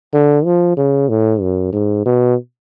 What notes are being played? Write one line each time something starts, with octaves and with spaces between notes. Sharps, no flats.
D3
F3
C#3
A2
F#2
G#2
B2